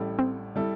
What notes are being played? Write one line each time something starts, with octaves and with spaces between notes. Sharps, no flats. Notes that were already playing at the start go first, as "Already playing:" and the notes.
Already playing: A1 A2 G3 E4 A4
C4
G3 E4 A4